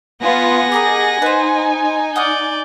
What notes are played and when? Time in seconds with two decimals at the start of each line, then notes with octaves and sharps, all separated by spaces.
0.22 B3 F4 B4 F#5 G#5 A#6
0.72 G4 G#4 A#4 D#5
1.22 D#4 B4 C5
2.16 D5 F#5 D#6 F6 G6